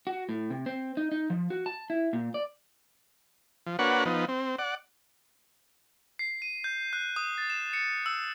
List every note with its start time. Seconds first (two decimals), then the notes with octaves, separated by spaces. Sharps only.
0.07 F#4
0.29 A2
0.50 C3
0.66 C4
0.97 D#4
1.12 D#4
1.30 F3
1.50 F#4
1.66 A5
1.90 E4
2.13 A#2
2.34 D5
3.66 F3
3.79 A#3 D4 F#4 B4 C#5 F#5
4.05 F3 B3 D#4
4.28 C4
4.59 D5 F#5
6.19 C7
6.42 D#7
6.64 G6
6.93 F#6
7.16 D#6
7.38 A6
7.50 E7
7.73 C#7
8.06 E6